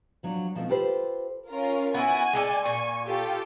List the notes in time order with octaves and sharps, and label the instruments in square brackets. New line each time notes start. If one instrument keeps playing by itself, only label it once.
[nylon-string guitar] F3 F#3 D4
B2 F3 A3 C4
F4 G4 A4 B4 C5
[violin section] C#4 F4 A#4
[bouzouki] B3 E4 F#4 [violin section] G#5
[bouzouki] G#3 A4 D5
[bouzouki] A#2 [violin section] G#5 C#6
[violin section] F4 G4 A4